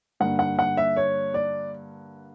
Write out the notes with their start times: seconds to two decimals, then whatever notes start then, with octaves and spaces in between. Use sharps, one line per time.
0.20 G2 D3 A#3 F#5
0.39 F#5
0.59 F#5
0.77 E5
0.97 C#5
1.34 D5